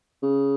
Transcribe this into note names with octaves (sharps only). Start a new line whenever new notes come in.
C#3